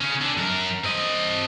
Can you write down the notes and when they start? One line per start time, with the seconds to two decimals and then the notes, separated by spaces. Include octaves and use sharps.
0.01 C#3 C#4
0.21 D3
0.37 F#2 A#4
0.84 C4 D#5